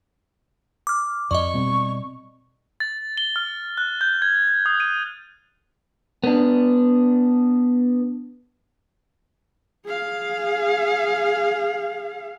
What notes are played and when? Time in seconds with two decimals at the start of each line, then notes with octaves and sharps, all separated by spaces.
0.87 D6 F6
1.31 F2 D5 D#5 C#6
1.53 B2 G3 C4
2.80 A6
3.18 G7
3.36 F6
3.78 F#6
4.01 G6
4.22 G#6
4.66 D#6
4.80 D#7
6.24 B3 D4
9.85 G#4 F5